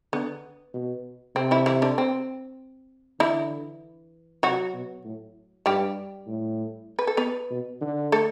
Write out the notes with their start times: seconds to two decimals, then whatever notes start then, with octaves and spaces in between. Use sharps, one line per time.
0.13 D3 B3
0.74 B2
1.35 C3 C4
1.51 E3 E4
1.66 E3 E4
1.82 D3 D4
1.98 C4
3.20 D3 E3 E4
4.43 C3 F#3 F#4
4.74 B2
5.04 A2
5.66 G2 G3 G4
6.27 A2
6.99 B4
7.07 A4
7.17 B3 B4
7.51 B2
7.81 D3
8.12 A3 A4